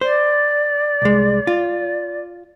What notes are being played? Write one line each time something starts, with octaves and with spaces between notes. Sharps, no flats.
C5 D5
C2 G#3
F4